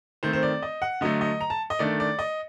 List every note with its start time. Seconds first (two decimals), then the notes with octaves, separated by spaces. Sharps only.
0.23 D#3 A3 C4 C5
0.33 C5
0.43 D5
0.62 D#5
0.82 F#5
1.01 D3 F#3 A3 D#5
1.21 D#5
1.41 A#5
1.50 A5
1.70 D#5
1.79 D#3 A3 D4 D5
2.00 D5
2.19 D#5